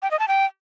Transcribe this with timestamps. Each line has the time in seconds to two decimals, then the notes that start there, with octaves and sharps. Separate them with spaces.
0.02 G5
0.11 D#5
0.19 A5
0.28 G5